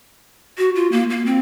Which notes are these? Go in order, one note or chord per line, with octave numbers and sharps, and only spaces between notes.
F#4
F4
A#3
A#3
C4